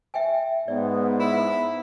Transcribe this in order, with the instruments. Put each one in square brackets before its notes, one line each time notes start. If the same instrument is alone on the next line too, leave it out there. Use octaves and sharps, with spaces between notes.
[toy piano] E5 G5 G#5
[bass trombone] G#2 [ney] B3 [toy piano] D5
[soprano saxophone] E4